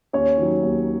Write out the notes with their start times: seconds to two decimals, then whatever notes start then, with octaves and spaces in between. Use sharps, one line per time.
0.13 D#2 C#4 C#5
0.38 D#3 F#3
0.63 D#2